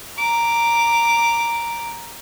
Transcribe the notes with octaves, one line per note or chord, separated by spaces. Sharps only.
A#5 D6